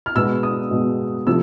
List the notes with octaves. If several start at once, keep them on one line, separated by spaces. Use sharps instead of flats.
F6
B2 G#3 B3 E6
D#6
B2 G#3 B3
C3 F3 A3 E6